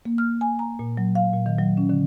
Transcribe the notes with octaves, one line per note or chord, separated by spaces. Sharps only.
A#3
F6
G#5
A#5
A#2
F#3
F5
A#2
D#3
F#3
C#4
D3